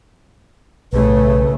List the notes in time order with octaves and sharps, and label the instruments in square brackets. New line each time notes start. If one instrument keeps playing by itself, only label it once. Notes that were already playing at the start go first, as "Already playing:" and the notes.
[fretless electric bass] B1 [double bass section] A2 C#3 A3 [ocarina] B4